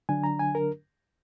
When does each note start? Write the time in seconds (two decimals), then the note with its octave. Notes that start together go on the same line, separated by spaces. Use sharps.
0.09 D3 F#3 D4 G#5
0.24 A#5
0.39 G#5
0.55 A#4